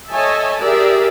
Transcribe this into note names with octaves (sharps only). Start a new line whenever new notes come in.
A4 C#5 D#5 E5 G#5 A5
G4 G#4 A#4 D5 E5